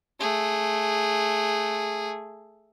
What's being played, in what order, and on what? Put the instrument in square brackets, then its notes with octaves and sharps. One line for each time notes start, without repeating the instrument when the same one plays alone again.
[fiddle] A3 G#4